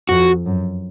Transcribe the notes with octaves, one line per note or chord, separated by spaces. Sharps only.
F2 F#4
F#2